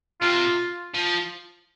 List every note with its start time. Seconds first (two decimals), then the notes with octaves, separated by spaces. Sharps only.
0.21 C3 F4
0.95 F3